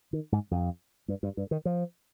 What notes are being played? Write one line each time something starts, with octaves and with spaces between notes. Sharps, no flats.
D#3
G#2
F2
G2
G2
G2
D#3
F3